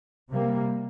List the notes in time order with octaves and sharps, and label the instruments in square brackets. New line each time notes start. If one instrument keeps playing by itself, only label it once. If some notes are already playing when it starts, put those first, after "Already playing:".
[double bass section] C3 G3 A#3